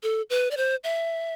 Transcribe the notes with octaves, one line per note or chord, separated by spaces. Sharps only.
A4
B4
D5
C5
E5